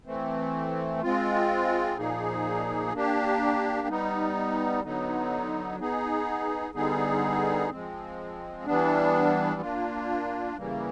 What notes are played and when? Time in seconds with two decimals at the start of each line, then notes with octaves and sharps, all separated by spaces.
0.06 E3 A3 C4
1.02 G#3 C4 F4
1.97 A#2 F3 A#3 D#4 G#4
2.93 A#3 D4 G4
3.88 G3 B3 D#4
4.83 D3 F#3 B3 D#4
5.80 B3 D#4 G#4
6.74 D3 G3 B3 D#4 G#4
7.70 F3 G#3 C4
8.65 E3 G3 B3 D4
9.61 A#3 D4 F4
10.56 C#3 E3 G3 A#3